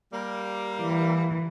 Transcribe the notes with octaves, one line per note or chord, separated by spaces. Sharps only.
G3 A#3
E3